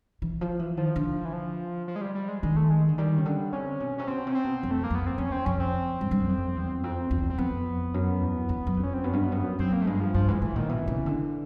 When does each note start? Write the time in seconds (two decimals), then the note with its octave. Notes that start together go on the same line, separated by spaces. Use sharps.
0.22 E3
0.41 F3
0.59 E3
0.77 D#3 F3
0.96 D3
1.25 E3
1.33 F3
1.88 F3
1.96 G#3
2.01 G3
2.15 G3
2.28 G#3
2.42 D#3 G#3
2.56 A3
2.70 G#3
2.89 D3
2.98 D#3 G3
3.17 C#3
3.25 D3
3.53 C3 C#4
3.80 B2
3.98 C3 C#4
4.08 B2 C4
4.27 C3
4.32 C#4
4.35 C4
4.44 B2
4.63 F2
4.71 A3
4.84 A#3
4.90 F2 B3
5.06 C4
5.18 E2 C#4
5.32 C4
5.45 F2 C#4
5.60 C4
6.01 G2
6.11 G2
6.20 F#2
6.29 F2
6.56 E2
6.84 F2 C4
7.11 E2
7.30 C4
7.38 F2 B3
7.94 F#2
8.21 E2
8.49 E2
8.67 F#2
8.77 F2
8.83 C#4
8.94 C4
9.04 F#2 B3
9.13 G2
9.23 F#2
9.32 G2
9.42 F#2
9.59 F#2 C4
9.73 A#3
9.81 A3
9.86 G2 G#3
10.00 F3
10.14 G2 F3
10.28 G#2 E3
10.42 A2 E3
10.56 A#2 D#3
10.69 B2 E3
10.88 C#3
11.06 D3